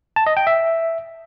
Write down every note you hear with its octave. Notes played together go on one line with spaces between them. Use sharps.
A5
D#5
G5
E5